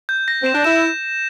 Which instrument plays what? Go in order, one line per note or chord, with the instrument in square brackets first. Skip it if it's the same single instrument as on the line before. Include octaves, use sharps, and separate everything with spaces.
[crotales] G6
A#6
[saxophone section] C4 [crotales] E7
[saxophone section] D4
[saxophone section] E4 [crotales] E7